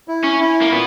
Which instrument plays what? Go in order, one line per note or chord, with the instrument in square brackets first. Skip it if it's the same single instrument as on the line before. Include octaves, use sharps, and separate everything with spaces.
[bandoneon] E4
[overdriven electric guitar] C#4
[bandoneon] E4
[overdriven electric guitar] A#3
[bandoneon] A#2 [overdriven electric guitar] B3